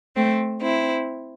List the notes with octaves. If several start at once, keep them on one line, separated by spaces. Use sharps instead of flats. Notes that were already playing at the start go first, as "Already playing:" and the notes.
A3 C4
C4 E4